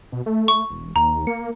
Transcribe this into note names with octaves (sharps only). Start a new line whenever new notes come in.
B2
A3
C#6
E1
D#2 A#5
A#3 C#7